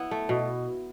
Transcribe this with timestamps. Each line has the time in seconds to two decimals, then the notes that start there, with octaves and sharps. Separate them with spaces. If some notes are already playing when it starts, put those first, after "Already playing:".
Already playing: B3 E4
0.11 A3
0.29 B2